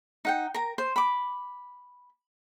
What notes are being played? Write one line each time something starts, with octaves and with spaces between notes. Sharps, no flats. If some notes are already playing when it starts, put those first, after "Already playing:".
D#4 F#5 G5
A#4 A#5
C5
B5 D6